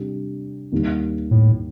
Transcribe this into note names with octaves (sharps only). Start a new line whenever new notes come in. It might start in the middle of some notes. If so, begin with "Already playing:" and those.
Already playing: C3 G3 D4 G4
D#2 D#3 G3
A2